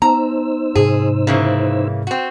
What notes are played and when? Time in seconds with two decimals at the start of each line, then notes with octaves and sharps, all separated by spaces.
0.02 B3 D#4 C5 A#5 E6
0.75 G#2 C3 G#4
1.27 C#3 E3 A#3
2.07 C4 F#4